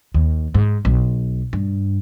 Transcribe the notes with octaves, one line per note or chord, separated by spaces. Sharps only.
D#2
G#2
B1
G2